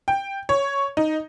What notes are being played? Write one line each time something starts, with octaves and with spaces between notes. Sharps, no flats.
G5
C#5
D#4